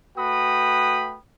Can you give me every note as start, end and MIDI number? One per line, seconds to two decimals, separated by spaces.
0.17 1.17 57
0.17 1.17 66
0.17 1.17 71
0.17 1.17 79
0.17 1.17 83
0.17 1.17 87